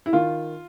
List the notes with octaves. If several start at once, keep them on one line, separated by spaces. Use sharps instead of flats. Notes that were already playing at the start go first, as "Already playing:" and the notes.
E4
D#3 F4